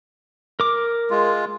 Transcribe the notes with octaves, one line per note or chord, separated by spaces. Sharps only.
A#4 D6
G#3 F4